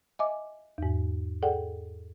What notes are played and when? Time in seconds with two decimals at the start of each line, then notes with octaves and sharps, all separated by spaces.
0.19 D#5 E5 G#5 D6
0.78 E2 G#2
1.43 G#4 A4 D5 F#5 G5